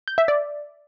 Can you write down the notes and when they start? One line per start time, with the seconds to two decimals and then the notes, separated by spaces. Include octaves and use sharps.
0.08 G6
0.18 E5
0.28 D5